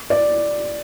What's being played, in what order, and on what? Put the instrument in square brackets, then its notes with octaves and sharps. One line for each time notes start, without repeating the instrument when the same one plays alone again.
[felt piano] D5